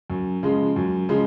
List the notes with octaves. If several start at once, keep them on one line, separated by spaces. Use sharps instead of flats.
F#2
C#3 F3 G#3
F#2
C#3 F3 G#3